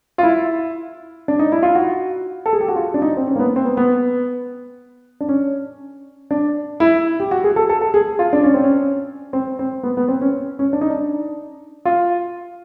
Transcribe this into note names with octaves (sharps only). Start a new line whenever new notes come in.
F4
E4
D4
D#4
E4
F4
F#4
A4
G#4
G4
F#4
F4
D4
D#4
C4
C#4
A#3
B3
C4
B3
B3
D4
C#4
D4
E4
G4
F#4
G#4
A4
A4
A4
G#4
F4
D4
C#4
C4
C#4
C4
C4
B3
B3
C4
C#4
C#4
D4
D#4
D4
F4